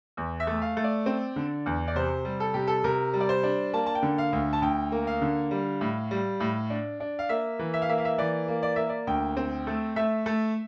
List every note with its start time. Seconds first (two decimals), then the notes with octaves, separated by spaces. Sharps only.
0.17 E2
0.40 E5
0.47 A3
0.62 F5
0.77 A3
0.84 D5
1.06 C4
1.36 D3
1.66 E2
1.88 D5
1.95 C3 C5
2.25 G3
2.40 A4
2.54 C3 G4
2.67 A4
2.84 C3 A#4
3.13 G3
3.20 D5
3.29 C5
3.43 D4
3.73 A#3 A5
3.86 A5
3.95 G5
4.03 D3
4.18 F5
4.33 D2
4.53 A5
4.62 D2 G5
4.92 A#3
5.07 F5
5.22 D3
5.51 G3
5.81 A2
6.11 G3
6.40 A2
6.70 D4
7.00 D4
7.19 F5
7.29 A#3 E5
7.59 E3
7.74 E5
7.82 F5
7.89 A#3 E5
7.98 F5
8.05 E5
8.18 E3 D5
8.48 A#3
8.63 D5
8.76 A#3 E5
8.89 D5
9.07 D2 G5
9.37 C4
9.67 A3
9.96 A3 E5
10.26 A3